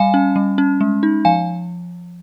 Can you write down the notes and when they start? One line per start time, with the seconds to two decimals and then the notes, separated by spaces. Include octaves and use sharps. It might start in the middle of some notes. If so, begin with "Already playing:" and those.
Already playing: G3 F5 G#5
0.14 C#4
0.36 G3
0.58 C#4
0.81 G#3
1.03 D#4
1.25 F3 F5 G#5